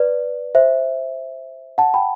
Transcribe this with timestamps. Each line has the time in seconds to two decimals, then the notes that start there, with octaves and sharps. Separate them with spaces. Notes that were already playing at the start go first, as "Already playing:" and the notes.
Already playing: B4 D5
0.55 C5 E5
1.78 F#5 A5
1.94 G5 B5